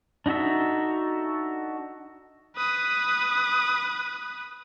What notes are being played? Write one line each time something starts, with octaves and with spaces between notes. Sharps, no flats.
D4 D#4 F#4 A4 E5
B4 D#6